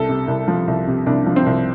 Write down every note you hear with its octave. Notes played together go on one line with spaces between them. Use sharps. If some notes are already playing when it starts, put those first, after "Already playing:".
Already playing: C2 A4
C3
C2
F3
C2
C3
C2 D4
F3
C4
C2